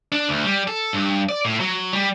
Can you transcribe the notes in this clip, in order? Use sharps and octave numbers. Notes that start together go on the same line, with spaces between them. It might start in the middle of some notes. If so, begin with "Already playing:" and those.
D4
D2
G3
A4
G2
D5
A2
F#3
G3